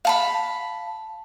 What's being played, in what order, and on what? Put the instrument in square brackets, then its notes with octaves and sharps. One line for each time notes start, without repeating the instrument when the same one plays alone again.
[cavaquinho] F5 A5 B5